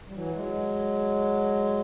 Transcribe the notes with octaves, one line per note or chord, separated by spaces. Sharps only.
G3
E3 F#3
F#3 G#3